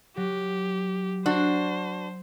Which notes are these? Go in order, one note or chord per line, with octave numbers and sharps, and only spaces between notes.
F#3 G4
D4 F#4 C5